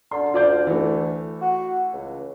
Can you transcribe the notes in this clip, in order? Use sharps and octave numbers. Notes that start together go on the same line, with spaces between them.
D3 C6
D2 F4 D5 G6
E3 A3
F#4
C#2